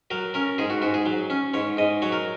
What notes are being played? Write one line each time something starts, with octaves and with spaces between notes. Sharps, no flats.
F#3 A#4
C#4 A#4
G#2 G#4
F#4
G#2 F#4
G#4
F#3
C#4
G#2 C#5
G#2 D#5
F#3 C#5
A#4